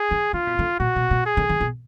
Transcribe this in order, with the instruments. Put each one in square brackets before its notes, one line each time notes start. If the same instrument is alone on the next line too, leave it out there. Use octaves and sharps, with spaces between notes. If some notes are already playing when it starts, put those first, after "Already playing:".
Already playing: [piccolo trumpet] G#4
[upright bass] D#3
[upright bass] D3 [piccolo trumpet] F4
[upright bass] B2
D3
[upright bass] A#2 [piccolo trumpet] F#4
[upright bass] B2
B2
[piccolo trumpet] G#4
[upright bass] D3
D#3
B2